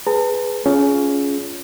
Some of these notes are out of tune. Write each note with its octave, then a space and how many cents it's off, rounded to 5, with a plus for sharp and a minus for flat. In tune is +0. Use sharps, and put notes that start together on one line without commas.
G#4 +0 B4 +0 A5 +45
C#4 +15 F4 +0 G#4 +15